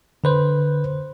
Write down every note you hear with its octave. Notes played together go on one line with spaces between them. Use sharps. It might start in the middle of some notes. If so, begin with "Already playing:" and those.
D3 B4 C5